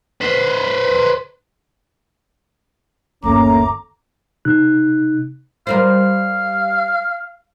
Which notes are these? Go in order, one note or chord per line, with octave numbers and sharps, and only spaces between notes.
B4 C5
G1 D#2 A3 A#3 C#4 A#5 D6
C3 D#4 F#6
G3 A#4 C5 F5